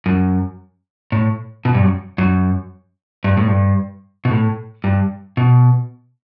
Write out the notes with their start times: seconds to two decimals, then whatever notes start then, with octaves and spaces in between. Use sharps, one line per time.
0.06 F#2
1.12 A2
1.65 B2
1.74 G2
1.83 F#2
2.18 F#2
3.24 G2
3.37 A2
3.48 G2
4.25 B2
4.31 A2
4.84 G2
5.37 B2